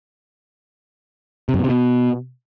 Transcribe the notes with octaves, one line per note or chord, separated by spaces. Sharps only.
C3
F#2
B2
C3
B2